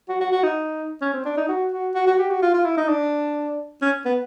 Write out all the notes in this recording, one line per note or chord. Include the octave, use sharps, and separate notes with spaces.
F#4
F#4
F#4
D#4
C#4
C4
D4
D#4
F#4
F#4
F#4
F#4
G4
F#4
F4
F4
E4
D#4
D4
C#4
B3